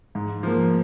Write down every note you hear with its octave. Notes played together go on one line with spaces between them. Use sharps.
G#2
F3 A#3